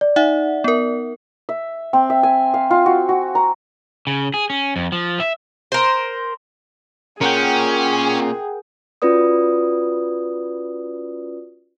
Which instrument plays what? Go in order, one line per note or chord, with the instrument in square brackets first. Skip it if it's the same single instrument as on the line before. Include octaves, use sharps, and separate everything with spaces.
[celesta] D5
[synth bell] D#4 E5 F#5
B3 A#4
[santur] E5
C4
E5
G#5
F5
F4
F#4
F#4
A#5
[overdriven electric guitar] C#3
G#4
C#4
F2
F3
E5
[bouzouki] A#4 C5
[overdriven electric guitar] A#2 [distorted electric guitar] C#4 [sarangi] G#4 [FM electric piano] A#4 F#5 G5
[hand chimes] C#4 F4 F#4 B4 D5 D#6